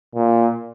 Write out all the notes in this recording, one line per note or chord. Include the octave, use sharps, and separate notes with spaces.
A#2